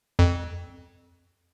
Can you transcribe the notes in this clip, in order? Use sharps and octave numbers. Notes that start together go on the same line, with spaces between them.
F2